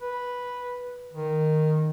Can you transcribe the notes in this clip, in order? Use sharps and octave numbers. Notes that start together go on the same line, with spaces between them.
B4
D#3